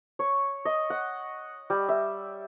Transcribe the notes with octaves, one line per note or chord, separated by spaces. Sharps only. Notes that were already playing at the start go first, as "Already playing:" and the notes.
C#5
D#5
F#5
G3
E5